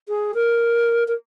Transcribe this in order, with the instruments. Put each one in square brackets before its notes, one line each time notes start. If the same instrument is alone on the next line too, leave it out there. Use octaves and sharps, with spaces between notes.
[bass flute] G#4
A#4
A#4